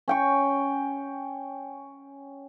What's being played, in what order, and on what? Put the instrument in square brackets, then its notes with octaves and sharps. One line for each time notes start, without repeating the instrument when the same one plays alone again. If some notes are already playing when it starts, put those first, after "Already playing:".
[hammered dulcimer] C#4 G5 C#6